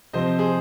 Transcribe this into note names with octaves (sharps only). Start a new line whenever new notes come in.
C3 F3 C4 C5 D#5
G#4 C5